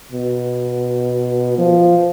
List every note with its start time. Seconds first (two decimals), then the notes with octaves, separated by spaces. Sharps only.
0.12 B2
1.58 F3